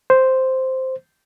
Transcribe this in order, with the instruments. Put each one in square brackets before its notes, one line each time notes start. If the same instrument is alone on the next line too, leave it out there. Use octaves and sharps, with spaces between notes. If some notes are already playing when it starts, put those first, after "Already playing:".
[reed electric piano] C5